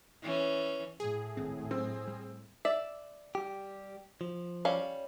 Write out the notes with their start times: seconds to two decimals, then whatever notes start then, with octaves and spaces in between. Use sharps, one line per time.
0.23 E3 C#4
1.00 A2 G#4
1.37 D#1 G#1 C4
1.71 G2 F#3 C4
2.07 G3
2.65 D5 E5
3.35 G3 G4
4.21 F3
4.65 G3 C#4 F5